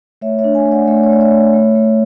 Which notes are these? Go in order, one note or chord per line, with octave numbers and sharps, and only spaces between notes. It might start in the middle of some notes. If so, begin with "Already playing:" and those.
A3 C#5 E5
C#5 E5
D4
E5 G#5
A3
D5 F#5
A3 C#5 E5
C#5
A3 D5
C#5 E5
A3
A3
A3